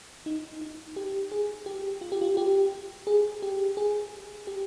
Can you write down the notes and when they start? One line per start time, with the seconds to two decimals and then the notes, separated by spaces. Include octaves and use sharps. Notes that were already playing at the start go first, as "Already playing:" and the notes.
0.26 D#4
0.61 D#4
0.96 G4
1.32 G#4
1.66 G4
2.01 F4
2.12 G4
2.22 F4
2.37 G4
3.07 G#4
3.42 G4
3.77 G#4
4.47 G4